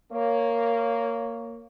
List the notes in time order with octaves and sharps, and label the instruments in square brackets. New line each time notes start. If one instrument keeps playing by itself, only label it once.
[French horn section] A#3 C#5